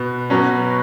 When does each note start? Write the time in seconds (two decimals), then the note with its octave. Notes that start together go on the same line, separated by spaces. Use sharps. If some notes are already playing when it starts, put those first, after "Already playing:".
Already playing: B2 B4
0.30 B2 F#3 C#4